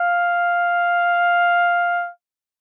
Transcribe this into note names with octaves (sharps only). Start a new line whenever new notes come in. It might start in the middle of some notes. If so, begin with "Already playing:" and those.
Already playing: F5